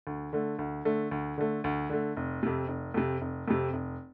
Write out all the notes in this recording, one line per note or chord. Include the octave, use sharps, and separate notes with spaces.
D2
D3 A3
D2
D3 A3
D2
D3 A3
D2
D3 A3
F1
F2 C3
F1
F2 C3
F1
F2 C3
F1